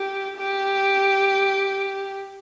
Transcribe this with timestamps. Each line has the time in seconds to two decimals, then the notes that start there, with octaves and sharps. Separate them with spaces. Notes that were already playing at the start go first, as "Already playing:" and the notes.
Already playing: G4
0.37 G4